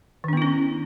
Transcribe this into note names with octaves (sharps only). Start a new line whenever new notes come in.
D#3 B3 C#4 D4 E4